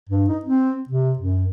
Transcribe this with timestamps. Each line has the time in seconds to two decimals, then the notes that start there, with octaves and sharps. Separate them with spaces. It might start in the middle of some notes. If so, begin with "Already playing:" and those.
0.09 G2
0.28 D#4
0.45 C4
0.89 C3
1.19 F#2